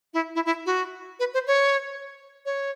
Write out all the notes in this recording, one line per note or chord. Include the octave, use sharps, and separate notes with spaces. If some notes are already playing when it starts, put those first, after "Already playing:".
E4
E4
E4
F#4
B4
C5
C#5
C#5